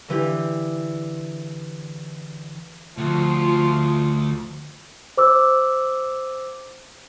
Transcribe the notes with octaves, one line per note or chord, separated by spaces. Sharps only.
D3 E3 G4
D2 F3 F4
C5 D6 E6